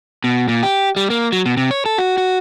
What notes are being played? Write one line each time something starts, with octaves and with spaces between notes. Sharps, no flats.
B2
A#2
G4
G3
A#3
F#3
B2
C3
C#5
A4
F#4
F#4